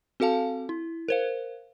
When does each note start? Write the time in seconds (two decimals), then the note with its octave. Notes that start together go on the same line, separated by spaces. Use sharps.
0.20 C4 F#4 A4 F5 A5
0.69 E4
1.08 A#4 C5 F5